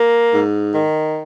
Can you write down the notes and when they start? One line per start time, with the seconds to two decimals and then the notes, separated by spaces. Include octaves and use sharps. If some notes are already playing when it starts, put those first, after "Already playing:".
Already playing: A#3
0.32 G#2
0.74 D#3